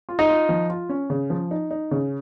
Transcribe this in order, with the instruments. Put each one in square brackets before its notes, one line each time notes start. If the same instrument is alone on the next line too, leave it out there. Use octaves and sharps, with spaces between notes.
[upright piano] F4
[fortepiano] D#4
[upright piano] F4
F3
F4
C#4
C#3
F3
D#4
D#4
C#3